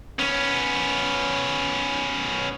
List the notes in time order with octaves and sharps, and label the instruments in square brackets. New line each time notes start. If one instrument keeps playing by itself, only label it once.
[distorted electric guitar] B3 C#4